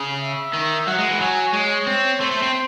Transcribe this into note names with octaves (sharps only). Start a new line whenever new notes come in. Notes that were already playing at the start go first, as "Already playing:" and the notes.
Already playing: C#3
E5
D#3
F#3 F#5
G#3
E3
F#3 G#5
G#3 C#5
C4
A3 C5
A3
C4